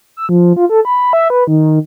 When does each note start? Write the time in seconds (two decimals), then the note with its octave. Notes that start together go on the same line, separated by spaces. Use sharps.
0.17 E6
0.29 F3
0.56 F4
0.69 A4
0.85 B5
1.13 E5
1.30 B4
1.47 D#3